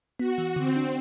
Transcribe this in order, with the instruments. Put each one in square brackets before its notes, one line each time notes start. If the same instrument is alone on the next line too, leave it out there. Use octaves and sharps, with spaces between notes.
[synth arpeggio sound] B3 [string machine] F#4
[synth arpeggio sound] E3
[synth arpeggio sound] D3 [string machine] C4
[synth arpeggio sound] D4